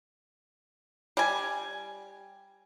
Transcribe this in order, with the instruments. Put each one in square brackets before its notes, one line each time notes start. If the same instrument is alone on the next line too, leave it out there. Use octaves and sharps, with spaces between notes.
[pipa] G3 G#5